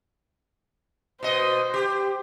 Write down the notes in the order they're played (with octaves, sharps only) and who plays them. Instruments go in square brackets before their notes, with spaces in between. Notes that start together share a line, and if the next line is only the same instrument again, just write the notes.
[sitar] B2 D#5 [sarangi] C5
[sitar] G4